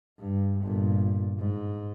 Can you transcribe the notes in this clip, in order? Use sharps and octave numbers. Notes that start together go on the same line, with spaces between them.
G2
G1 A#2
G#2